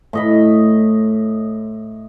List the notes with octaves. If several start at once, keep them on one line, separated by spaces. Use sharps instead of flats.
A2 D#5 B5